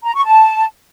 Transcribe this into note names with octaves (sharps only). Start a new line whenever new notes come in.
A#5
C#6
A5